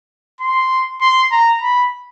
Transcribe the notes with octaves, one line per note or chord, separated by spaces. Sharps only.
C6
C6
A#5
B5